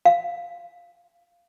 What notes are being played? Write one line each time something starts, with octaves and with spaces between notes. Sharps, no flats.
F5